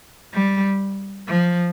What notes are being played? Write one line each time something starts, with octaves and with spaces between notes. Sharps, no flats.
G3
F3